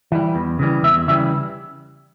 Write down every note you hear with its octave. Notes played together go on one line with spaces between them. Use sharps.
E3 G3
E2
C#3 E3 G3
E2 E5
C#3 E3 G3 E5